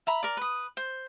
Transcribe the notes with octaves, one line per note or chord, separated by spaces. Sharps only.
E5 A#5 B5
A#4 D5
B4 D#6
C5